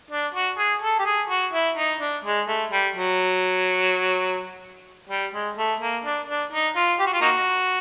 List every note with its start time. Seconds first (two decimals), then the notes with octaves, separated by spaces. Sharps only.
0.11 D4
0.34 F#4
0.58 G#4
0.82 A4
0.99 G4
1.05 G#4
1.30 F#4
1.53 E4
1.77 D#4
2.00 D4
2.25 G#3
2.48 A3
2.72 G3
2.96 F#3
5.09 G3
5.33 G#3
5.57 A3
5.80 A#3
6.04 D4
6.28 D4
6.52 D#4
6.76 F4
6.99 G4
7.06 F#4
7.13 F4
7.21 A#3 D#4 F#4